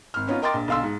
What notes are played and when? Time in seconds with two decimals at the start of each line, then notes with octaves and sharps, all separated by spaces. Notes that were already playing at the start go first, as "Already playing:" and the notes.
0.14 G#1 F6
0.27 B3 C#4 D#4 F4
0.42 A#4 D#5 G5 C6 D6 A6
0.54 A#1
0.68 B1 D3 F5 C6 E6
0.83 G#2